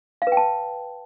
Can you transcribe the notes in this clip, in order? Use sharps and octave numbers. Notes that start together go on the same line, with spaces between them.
F5
B4
G5
A5